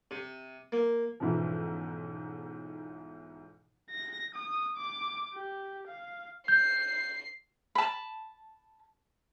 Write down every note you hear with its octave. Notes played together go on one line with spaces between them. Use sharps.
C3
A#3
B1 G#2 C#3 E3 F3
A#6
D#6
D6
G4
F5
G6 C7
A5 B5